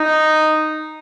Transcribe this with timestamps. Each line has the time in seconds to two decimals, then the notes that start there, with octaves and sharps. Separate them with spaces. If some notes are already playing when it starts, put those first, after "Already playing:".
Already playing: D#4